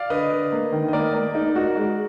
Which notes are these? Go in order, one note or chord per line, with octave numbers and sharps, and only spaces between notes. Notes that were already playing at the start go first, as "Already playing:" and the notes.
Already playing: D5 F5
D3 B4 D#5
D3
A#3
D#3
D#5
A#3 A#4 D5
A#3
D#4
F#4
G#3